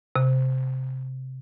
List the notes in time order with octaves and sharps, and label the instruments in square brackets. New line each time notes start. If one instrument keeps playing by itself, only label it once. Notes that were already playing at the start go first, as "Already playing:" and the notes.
[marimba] C3